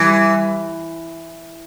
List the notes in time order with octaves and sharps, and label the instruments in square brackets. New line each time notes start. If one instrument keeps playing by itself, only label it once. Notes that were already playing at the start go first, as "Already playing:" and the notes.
Already playing: [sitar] E3 [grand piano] G3